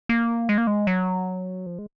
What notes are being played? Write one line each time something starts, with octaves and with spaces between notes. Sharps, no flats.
A#3
G#3
A#3
G#3
F#3
F3
G#3